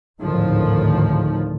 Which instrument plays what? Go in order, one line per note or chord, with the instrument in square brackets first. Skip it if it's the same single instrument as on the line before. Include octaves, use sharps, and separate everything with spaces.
[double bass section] G#1 D2 A2 D#3 F3